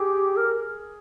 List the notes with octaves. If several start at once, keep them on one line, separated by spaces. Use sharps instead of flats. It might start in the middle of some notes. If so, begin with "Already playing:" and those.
Already playing: G4 G#4
A#4